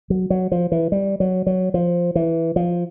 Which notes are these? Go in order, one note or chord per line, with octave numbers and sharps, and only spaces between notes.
F#3
F#3
F3
E3
G3
F#3
F#3
F3
E3
F3